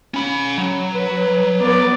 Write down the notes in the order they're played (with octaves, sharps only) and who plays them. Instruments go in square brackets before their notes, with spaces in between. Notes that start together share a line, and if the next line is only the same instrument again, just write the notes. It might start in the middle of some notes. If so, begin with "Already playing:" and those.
[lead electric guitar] C#4 B5
F#3
[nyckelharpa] B4
B3 D5